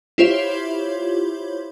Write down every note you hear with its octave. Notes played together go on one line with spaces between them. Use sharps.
E4 F4 G4 C5 C#5 E5